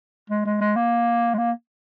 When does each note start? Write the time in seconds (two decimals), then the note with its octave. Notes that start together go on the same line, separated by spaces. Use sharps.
0.30 G#3
0.46 G#3
0.61 G#3
0.76 A#3
1.34 G#3
1.38 A#3